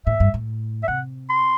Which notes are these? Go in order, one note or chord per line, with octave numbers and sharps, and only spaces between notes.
A2 E5
G2
A2
E5
C3 F#5
C6